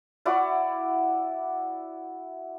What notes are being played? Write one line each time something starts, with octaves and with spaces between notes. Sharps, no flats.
E4 F#4 D5